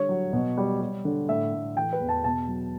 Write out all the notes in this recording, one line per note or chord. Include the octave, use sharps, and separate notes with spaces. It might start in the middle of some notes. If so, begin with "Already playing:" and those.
Already playing: D3 G3 C#5
F#3
B2
G3
G3
D3
A2 E5
A2
E3 G5
B4
E2
A5
B2 A5
F#3